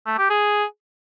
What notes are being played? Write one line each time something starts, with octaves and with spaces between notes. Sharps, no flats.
A3
G4
G#4